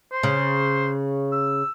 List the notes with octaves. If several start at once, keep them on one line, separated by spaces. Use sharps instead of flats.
C5
C#3
E6